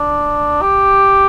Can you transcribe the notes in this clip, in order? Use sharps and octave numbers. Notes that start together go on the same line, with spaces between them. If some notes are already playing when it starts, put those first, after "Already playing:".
Already playing: D4
G4